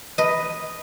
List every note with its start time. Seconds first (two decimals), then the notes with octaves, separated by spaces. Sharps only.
0.18 B4 D#5